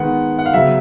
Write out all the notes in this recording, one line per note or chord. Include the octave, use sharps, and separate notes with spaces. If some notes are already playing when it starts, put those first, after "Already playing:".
Already playing: D#3 G#3 B3 F#5
F#5
F5
C#3 F#3 B3 E5